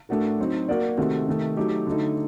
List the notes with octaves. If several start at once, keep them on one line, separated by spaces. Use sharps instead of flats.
A2 A3 D4 F#4 A#4
F#3 C4 D#4
A#3 F#4 A#4 D5
C3 D#3 A3 C4 F#4
C3 D#3 A3
F#3 A3 D#4 G4
D3 F#3 A3 D#4